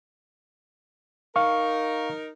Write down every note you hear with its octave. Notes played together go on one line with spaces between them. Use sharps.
D#4 A#4 F5 C#6